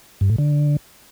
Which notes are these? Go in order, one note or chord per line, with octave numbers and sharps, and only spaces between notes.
G2
A2
D3